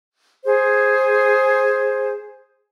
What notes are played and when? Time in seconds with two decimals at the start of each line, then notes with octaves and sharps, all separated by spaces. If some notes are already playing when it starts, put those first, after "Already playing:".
0.44 G#4 C5